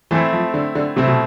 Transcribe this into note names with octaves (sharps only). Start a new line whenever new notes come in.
E3 A3 C4 E4
F3
D3
D3
C3 A3 C4 E4
B2